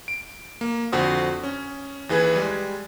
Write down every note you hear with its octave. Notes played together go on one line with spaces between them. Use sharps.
D7
A#3
F2 D3 F#4 C5 D#6
C#4
D#2 E3 G#4 B4 G#6
G3 G#3